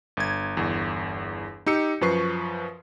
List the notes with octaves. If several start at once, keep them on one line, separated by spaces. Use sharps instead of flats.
G1 G#6
G1 E2
D#4 G4 E6 C#7
F#2 F3 B4 C#6 C7